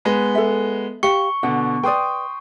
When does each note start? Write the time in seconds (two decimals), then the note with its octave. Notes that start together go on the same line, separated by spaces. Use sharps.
0.05 G#3 B3 B4
0.35 A4 E5
1.03 G4 F5 C#6 C#7
1.43 B2 D3 F#5
1.83 B4 D5 G5 C6 D#6